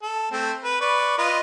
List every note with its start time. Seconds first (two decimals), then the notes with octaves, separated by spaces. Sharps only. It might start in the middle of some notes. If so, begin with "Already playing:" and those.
0.02 A4
0.32 A3 C4
0.64 B4
0.81 B4 D5 C#6
1.18 F4 B4 D#5